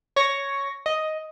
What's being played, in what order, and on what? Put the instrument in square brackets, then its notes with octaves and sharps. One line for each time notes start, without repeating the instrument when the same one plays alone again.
[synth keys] C#5 C#6 A#6
D#5